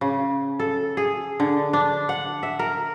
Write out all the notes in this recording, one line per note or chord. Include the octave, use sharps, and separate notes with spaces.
C#3
A4
G#4
D3
D4
F#5
E5
A#4